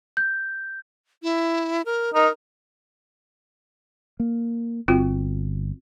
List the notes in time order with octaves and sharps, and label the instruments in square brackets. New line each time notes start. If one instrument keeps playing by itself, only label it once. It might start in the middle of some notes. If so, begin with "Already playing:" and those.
[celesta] G6
[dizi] E4
A#4
[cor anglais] D#4 [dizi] A#4
[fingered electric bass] A#3
[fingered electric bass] G1 [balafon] C4 F4 F#4